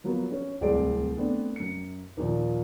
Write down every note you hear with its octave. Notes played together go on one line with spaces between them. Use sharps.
F3 F#3 A#3 B3
C#4
D1 C2 C4 G#4 D5 D7
A3 B3 C4 D4
F#2 C#7
D#2 A#2 F3